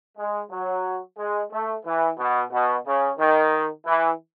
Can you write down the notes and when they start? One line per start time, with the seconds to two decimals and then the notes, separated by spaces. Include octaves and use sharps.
0.17 G#3
0.50 F#3
1.18 G#3
1.51 A3
1.84 E3
2.18 B2
2.52 B2
2.86 C#3
3.19 D#3
3.86 E3